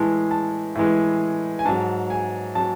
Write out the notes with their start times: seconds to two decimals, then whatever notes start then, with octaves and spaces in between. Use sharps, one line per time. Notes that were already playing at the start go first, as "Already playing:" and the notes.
Already playing: A2 E3 G#3 A5
0.31 A5
0.75 A2 E3 G#3
1.59 G#5
1.65 G#2 F#3 A5
2.10 G#5
2.55 F#3 A5